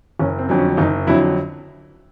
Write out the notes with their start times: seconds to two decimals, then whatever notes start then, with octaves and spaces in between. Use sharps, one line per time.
0.19 F#1 C#4
0.39 C4
0.49 F2 D3 F#3
0.59 C#4
0.77 F#1 D#4
1.07 F2 D3 F#3 E4